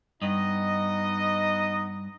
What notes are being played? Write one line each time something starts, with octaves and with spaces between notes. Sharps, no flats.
G2 B3 D#4 D#5